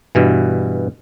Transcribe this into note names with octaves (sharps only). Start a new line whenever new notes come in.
G2 B2 E3